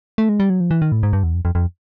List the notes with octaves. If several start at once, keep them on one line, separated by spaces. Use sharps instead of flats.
A3
G#3
G3
F#3
F3
E3
D#3
A2
G#2
G2
E2
F2
F2
F2